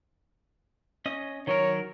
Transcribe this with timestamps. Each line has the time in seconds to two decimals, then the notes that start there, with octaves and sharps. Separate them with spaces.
1.06 C#4 D#5 D#6
1.47 D#3 F#3 A#4 C#5